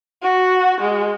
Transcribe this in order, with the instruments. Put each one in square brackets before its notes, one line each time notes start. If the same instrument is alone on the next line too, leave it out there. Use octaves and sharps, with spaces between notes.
[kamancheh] F#4
G#3